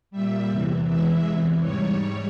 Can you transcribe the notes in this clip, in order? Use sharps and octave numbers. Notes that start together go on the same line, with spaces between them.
A#2 G3 E5
E2 C3 E3
E2 E3 G#3 E5
E2 C3 E3
G#2 G3 C#5